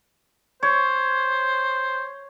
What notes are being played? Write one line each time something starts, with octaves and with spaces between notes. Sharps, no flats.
C5 C#5